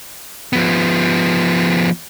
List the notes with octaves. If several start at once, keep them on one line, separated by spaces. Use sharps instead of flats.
F3 B3